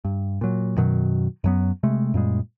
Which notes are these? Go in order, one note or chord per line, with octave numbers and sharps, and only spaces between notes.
G2
A#2 F#3
F#2 B2 D#3 F#3
F#2 F#3 B3
C3 G#3 A3
F#2 A#2 G3 G#3